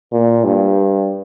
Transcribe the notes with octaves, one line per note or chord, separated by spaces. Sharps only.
A#2
G2